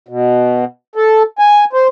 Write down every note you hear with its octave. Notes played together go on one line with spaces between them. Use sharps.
B2
A4
G#5
C5